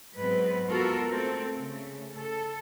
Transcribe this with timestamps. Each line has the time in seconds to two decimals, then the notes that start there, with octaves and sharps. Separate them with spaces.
0.17 G#2 F#3 G#3 B3 C4 B4
0.67 G#3 B3 F4 F#4 A4 A#4
1.11 A3 C4 A4
1.56 C#3 A3
2.17 A4